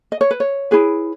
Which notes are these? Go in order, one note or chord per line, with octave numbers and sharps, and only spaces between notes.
D#5
C#5
B4
C#5
E4 G#4 B4